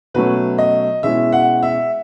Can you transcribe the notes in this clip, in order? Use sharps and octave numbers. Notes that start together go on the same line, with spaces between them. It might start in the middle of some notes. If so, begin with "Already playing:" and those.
B2 F#3 A3 C#4 B4
D#5
B2 G#3 C#4 E4 E5
F#5
E5